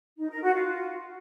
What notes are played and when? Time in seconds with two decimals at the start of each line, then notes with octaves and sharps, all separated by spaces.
0.18 D#4
0.30 A#4
0.42 F#4
0.54 F4